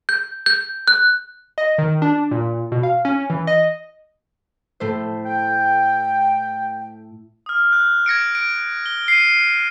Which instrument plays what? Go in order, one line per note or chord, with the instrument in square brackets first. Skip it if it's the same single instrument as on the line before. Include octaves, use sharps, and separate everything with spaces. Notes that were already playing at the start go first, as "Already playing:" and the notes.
[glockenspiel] G6
G6
F#6
[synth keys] D#5
D#3
D4
A#2
B2
F5
C#4
E3
D#5
[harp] A2 A3 C5
[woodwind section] G5
[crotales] D#6 F6
F#6
G#6 A#6 C#7 D7
D7
G7
C7 D#7